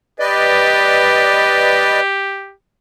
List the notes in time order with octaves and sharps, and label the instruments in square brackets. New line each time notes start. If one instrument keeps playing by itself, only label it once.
[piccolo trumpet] G4 [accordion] B4 D5 D#5